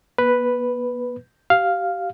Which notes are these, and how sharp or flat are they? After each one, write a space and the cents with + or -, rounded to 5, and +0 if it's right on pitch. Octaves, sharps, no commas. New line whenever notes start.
B3 -45 B4 +0
G4 -30 F5 +0